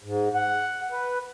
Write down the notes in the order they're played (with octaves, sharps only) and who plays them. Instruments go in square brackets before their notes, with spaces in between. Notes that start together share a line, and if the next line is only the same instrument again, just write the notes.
[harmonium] G#2
F#5
B4